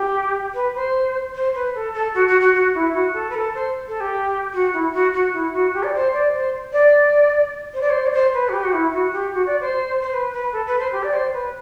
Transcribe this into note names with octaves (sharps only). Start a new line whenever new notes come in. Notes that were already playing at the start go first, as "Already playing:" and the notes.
Already playing: G4
B4
C5
C5
B4
A4
A4
F#4
F#4
F#4
F#4
E4
F#4
A4
B4
A4
C5
A4
G4
F#4
E4
F#4
F#4
E4
F#4
G4
D5
C5
D5
C5
D5
C5
D5
C5
D5
C5
B4
F#4
G4
F#4
E4
F#4
G4
F#4
D5
C5
C5
B4
B4
A4
B4
C5
G4
D5
C5
B4